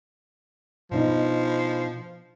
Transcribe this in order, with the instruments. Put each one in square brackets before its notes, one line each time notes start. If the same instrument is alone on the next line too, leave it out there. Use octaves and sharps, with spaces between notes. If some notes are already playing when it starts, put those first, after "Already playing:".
[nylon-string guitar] B2 D4 D#4 [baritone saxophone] F3